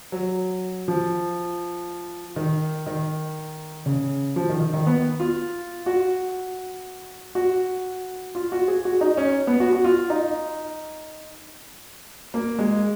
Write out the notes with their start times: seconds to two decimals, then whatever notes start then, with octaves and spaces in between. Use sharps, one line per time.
0.12 F#3
0.88 F3
2.36 D#3
2.87 D#3
3.86 C#3
4.36 F3
4.49 D#3
4.61 D#3
4.73 D#3
4.87 B3
5.20 F4
5.86 F#4
7.35 F#4
8.35 F4
8.52 F#4
8.68 G#4
8.85 F#4
9.01 D#4
9.17 C#4
9.47 B3
9.60 F#4
9.73 F#4
9.84 F4
10.10 D#4
12.34 A#3
12.59 G#3